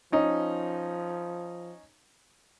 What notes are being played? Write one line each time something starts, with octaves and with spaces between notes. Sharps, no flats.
F3 C#4 D#4